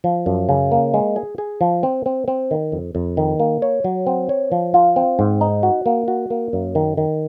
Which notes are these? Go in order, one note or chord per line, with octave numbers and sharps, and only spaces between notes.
F3
F#2
C#3
A#3
G#3
G#4
G#4
F3
C4
C4
C4
D#3
F2
F2
D#3
A#3
C#5
F#3
C4
C#5
F3
F4
C4
G#2
D#4
F#4
A#3
F#4
A#3
F#2
D#3
D#3